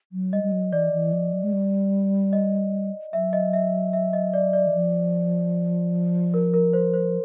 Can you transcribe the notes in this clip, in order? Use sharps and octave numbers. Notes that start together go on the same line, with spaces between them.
F#3
G3 D#5
G3
F#3
E3 D5
E3
F3
F#3
G#3
G3
D#5
F#3 E5
D#5
E5
E5
D#5
D5
D5
E3
F3
A#4
A#4
C5
C5